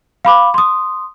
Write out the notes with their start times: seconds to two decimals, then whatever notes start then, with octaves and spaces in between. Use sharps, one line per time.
0.25 F5 B5 D6
0.54 C6 D#6